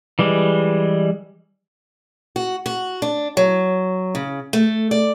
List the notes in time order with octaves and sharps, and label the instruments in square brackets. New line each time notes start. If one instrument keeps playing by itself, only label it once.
[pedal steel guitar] E3 G3 G#3
[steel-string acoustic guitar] F#4
F#4
D4
F#3
C#3
A3
D5